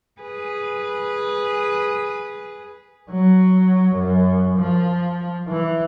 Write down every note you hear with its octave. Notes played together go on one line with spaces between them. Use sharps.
G#4 B4
F#3
F#2
F3
E3